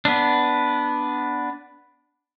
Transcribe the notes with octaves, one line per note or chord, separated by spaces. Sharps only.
B3 D4